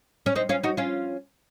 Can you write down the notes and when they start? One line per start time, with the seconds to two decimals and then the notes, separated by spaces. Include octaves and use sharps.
0.26 C#4
0.35 C4 D#4
0.49 C#4 F4
0.63 D#4 F#4
0.77 C#4 F4